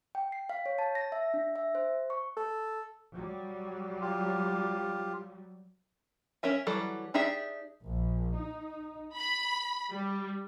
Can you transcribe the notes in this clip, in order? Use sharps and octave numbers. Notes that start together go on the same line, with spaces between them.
G5
C7
F5
C#5
A5
A#6
E5
D4
E5
C5
C#6
A4
F#3 G3
F4 G4
C#4 A#4 E5 G#5
E3 F#3 G3 A4
D4 D#4 G4 G#4 E5
A#1
D#4
B5
G3